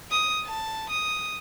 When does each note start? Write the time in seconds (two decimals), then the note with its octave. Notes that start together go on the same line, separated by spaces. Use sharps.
0.11 D#6
0.45 A5
0.89 D#6